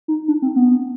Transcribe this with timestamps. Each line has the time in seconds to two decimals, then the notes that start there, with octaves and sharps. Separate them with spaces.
0.08 D#4
0.28 D4
0.42 C4
0.56 B3